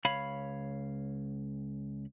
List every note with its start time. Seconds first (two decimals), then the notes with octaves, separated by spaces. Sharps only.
0.05 C#2 C#5 F5 B5